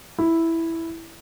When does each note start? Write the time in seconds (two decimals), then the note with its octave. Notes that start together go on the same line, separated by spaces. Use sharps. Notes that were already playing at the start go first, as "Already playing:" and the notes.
0.19 E4